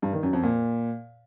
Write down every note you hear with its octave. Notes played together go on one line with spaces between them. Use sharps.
G2
D#3
F#2
F2
A#2